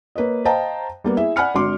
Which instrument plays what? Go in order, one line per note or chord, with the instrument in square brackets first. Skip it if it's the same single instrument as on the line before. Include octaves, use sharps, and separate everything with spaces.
[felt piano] A#3 B4 C#5 D#5
C5 D#5 F5 G5 A5 A#5
G3 A#3 B3
E4 G#4 E5
D5 F#5 G#5 B5 F6 C#7
G#1 D3 F#4 C6 D6